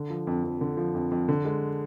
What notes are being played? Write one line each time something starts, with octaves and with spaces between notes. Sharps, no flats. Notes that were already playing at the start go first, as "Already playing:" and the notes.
Already playing: D3
F3
F2
F2
D3
F3
F2
F2
D3
G#3